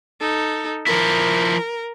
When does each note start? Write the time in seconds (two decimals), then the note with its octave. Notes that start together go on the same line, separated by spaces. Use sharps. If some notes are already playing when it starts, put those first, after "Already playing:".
0.21 D#4 A4
0.87 F3 E4 A#4